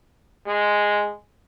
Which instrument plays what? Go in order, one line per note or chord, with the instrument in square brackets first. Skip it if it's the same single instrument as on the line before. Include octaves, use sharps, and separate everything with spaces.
[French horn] G#3